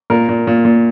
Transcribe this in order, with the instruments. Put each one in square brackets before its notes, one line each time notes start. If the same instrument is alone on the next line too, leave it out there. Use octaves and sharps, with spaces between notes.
[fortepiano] A#2 A#4
A#2
A#2
A#2